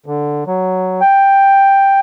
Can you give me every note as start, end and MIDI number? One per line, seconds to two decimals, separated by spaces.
0.06 0.44 50
0.47 1.01 54
1.01 2.00 79